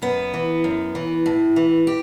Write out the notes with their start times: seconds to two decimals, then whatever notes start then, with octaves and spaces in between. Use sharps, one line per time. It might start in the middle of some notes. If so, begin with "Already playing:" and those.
0.02 F#2 B3
0.34 E3
0.64 F#2
0.95 E3
1.26 A2
1.56 E3
1.87 G4